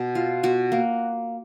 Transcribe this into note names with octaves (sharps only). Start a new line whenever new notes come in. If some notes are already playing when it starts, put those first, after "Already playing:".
Already playing: B2
F4
B2 F#4
A#3